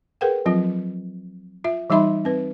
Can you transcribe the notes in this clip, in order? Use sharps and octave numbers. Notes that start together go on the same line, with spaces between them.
G#4 A#4 B4 F#5 G5
F3 F#3 C4 F4
F4 E5
E3 G3 D#4 E5 B5 C6
C4 B4